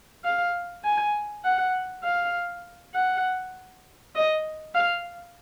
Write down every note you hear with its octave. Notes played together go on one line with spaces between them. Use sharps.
F5
G#5
F#5
F5
F#5
D#5
F5